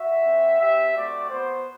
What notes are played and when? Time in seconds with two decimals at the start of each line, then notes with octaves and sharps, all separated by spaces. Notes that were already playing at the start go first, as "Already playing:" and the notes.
Already playing: F#4 E5
0.26 C4 F#4
0.61 C4 G4 E5
0.96 A3 C4 F#4 D5
1.30 B3 F#4 C5